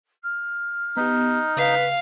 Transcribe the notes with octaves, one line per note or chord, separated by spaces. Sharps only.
F6
B3 D#4 G4
C#3 B4 F5